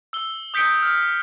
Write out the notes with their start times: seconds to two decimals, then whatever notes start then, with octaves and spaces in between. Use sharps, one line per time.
0.13 E6 G7
0.54 D#6 G6 B6 C#7 D7 G7
0.82 F6